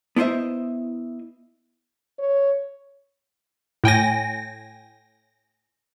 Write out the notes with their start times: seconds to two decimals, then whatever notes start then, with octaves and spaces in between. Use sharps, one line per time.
0.16 B3 E4 C5 D#5 E5
2.19 C#5
3.84 A2 G5 G#5 A#6